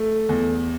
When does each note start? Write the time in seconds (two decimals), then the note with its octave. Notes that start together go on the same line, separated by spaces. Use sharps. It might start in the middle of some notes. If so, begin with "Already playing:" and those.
Already playing: A3
0.29 E2